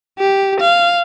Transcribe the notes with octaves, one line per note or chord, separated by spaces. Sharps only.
G4
F5